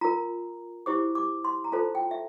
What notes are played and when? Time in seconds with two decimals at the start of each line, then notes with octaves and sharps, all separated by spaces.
0.01 F4 A#4 A#5
0.86 E4 G4 C5 D6
1.15 D6
1.45 C6
1.64 A#5
1.72 F4 A4 C5 A5
1.95 G5
2.11 E5